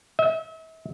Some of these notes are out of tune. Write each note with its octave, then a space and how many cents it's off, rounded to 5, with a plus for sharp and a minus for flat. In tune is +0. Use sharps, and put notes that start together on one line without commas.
E5 -40